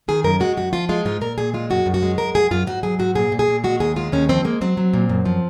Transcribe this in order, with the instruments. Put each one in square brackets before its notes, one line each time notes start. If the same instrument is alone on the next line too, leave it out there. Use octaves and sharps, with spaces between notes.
[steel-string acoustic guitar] D#3 G#4
F#2 A#4
G#3 F#4
F#2 F#4
F3 F4
G#3 F4
G#2 F4
A#2 A#4
A#2 G#4
G#3 F4
F#2 F#4
F#2
F#4
G#3
F#2 A#4
F#2 G#4
F#2 F4
G#2 F#4
F#3 G#4
G#2 F#4
A#2 G#4
A#2
G#4
A#2
G#3 F#4
D#2 G#4
G#3 F4
D#2 C#4
F3 C4
G#3 A#3
F#3 C4
F#3
A#2
F#2
F3